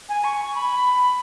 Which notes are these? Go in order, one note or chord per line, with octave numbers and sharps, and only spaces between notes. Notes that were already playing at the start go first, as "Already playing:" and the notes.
G#5
C#6
B5